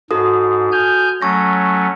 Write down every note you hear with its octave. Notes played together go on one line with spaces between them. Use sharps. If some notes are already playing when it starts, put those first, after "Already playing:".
G#2 F#4 A4 D#6
G#5 F6 G6
F#3 A3 C#4 C#6 A#6